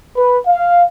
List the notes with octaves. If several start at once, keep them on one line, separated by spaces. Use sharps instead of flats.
B4
F5